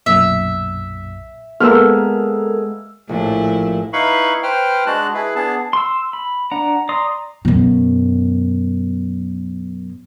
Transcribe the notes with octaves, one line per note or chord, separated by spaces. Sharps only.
B1 F#2 A#2 E5
G#3 A#3 B3 A4 A#4 E6 F6
A#1 A2 E4
D#4 E4 B4 F5 B5 C#6
B4 C5 G5 F6
G#3 D4 F#4 A5 F#6
E4 G#4 B4
B3 D4 G#4 A5
C6 E6
B5
D4 F#5 A#5
D5 A#5 C6 D#6
F#2 B2